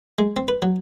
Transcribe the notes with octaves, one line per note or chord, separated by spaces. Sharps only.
G#3
C4
B4
F#3